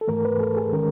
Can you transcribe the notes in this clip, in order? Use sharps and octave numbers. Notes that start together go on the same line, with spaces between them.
A4
G#2 E3 A3 A#4
B4
A4
G#4
D#3 G#3 C#4 A#4